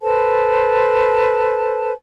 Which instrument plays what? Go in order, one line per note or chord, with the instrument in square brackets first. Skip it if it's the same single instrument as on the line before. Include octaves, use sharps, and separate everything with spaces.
[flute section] A4 B4 C5 A5